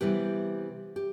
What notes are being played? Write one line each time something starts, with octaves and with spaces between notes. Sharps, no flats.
C3 E3 G3 B3 E4 G4 B4
G4